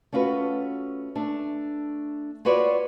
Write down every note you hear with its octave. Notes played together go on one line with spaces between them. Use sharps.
A3 C#4 F4 F#4 B4
A3 D4
F4 F#4 B4 C#5 D5